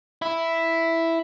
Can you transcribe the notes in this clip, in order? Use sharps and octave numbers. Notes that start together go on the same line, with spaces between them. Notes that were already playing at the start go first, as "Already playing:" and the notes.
E4